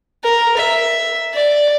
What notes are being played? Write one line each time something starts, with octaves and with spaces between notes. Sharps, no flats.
A#4
E5
D5